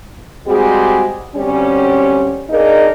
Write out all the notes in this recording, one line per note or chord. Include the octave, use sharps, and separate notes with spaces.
G3 G#3 C4 F#4 G#4
D2 G3 C4 C#4
A#3 D4 D#4 G#4 A#4